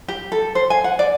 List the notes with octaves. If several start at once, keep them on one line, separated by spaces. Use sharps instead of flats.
G4
A4
C5
G#5
F#5
D5